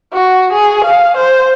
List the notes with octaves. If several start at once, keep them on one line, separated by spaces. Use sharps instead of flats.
F#4
G#4
F5
C5